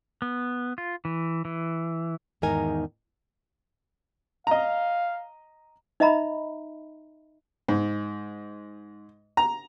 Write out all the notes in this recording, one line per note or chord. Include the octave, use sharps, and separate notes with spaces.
B3
F4
E3
E3
E2 G#2 D#3 D#4 A#4 G#5
D#5 F5 A#5
D#4 D#5 E5 A#5 B5
G#2
A#5